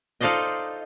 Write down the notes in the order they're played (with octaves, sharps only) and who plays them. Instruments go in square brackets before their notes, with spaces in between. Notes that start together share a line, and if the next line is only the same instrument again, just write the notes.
[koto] D#4 F4 A4 C5 D5 D#5